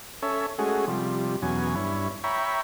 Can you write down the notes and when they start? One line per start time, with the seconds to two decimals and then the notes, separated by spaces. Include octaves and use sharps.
0.22 C#4 A4 C#5 E5
0.59 G#3 A3 C#4 F#4 G#4
0.88 C3 F3 G3
1.42 E2 B2 F#3 C#4 G#5
1.75 G2 E4 C#5
2.24 C#5 E5 G5 A#5 B5 C#6